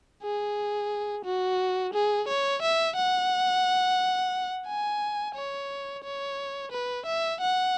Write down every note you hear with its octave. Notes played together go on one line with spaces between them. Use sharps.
G#4
F#4
G#4
C#5
E5
F#5
G#5
C#5
C#5
B4
E5
F#5